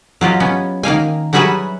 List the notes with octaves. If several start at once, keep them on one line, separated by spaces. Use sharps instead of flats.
F#3 F4 G4 D#5
B3 C#4
D#3 A#3 F5 G#5
F#3 G3 F#4 G#4 B4 E5